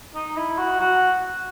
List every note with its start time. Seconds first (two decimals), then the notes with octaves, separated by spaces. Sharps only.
0.15 D#4
0.37 E4
0.58 F#4
0.80 F#4